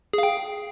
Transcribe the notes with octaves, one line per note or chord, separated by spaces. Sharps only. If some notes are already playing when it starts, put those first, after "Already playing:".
G#4 F5 G5